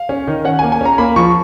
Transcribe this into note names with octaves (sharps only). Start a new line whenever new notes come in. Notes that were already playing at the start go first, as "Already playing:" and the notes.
Already playing: F5
C#4
D#3
C#4 F#5
A#3 G#5
G#5
C#4 A#5
A#3 B5
F3 C#6